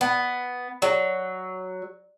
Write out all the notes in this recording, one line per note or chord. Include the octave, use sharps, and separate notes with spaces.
B3
F#3